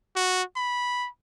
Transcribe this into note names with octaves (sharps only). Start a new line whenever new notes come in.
F#4
B5